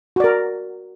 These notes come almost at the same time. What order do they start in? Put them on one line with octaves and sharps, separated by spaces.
F#4 D5 A#4